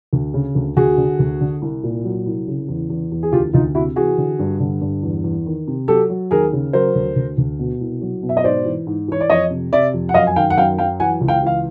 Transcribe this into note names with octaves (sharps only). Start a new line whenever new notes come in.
D2
C#3
D2
D2 F#4 G#4
D3
D2
D3
C2
A#2
F#3
C2
C#3
E2
E2
E2
G#4
D2 F4 G4
D2 D#4 F4
C3 E4 F#4
E3 F#4 G#4
D3
G2
D3
G2
E2
E2
D#3
C3
F#3 G4 A4
F#3
D#2 G#4 A#4
C#3
F#3 A#4 C5
D2
D2
D2
B2
C2
F#3
B2
E5
D#5
G#2 C5 D5
E3
G#2
E3 C#5
D5
F2 C#5 D#5
C3
C3 D5 E5
F2
F#5
F#2 D#5 F5
G#5
D#3 F5 G5
F#5
F#2 F5 G5
F#3 F5 G5
E3 F#5 G#5
C#2
F5 G5
E3 F5